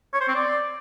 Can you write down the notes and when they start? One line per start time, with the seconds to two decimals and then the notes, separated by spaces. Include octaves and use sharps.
0.13 C#5
0.21 C5
0.28 C4
0.35 D5